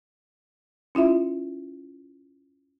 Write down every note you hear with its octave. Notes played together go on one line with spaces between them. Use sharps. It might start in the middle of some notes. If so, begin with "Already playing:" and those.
C#4 E4 F4 E5